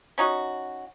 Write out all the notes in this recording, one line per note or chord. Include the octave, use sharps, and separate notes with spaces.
C#4 D#4 F#4